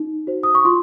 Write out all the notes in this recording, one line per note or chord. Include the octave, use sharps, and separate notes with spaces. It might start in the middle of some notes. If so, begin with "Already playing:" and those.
Already playing: D#4
F#4 C5
D#6
C#6
F4 C6